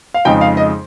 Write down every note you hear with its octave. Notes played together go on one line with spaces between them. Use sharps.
F5
F2 C#3 G#3 D#4 G5
F5
D#5